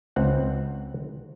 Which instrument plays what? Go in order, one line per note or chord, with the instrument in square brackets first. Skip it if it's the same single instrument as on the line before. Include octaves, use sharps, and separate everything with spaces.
[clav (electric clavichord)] C#2 C4 F#5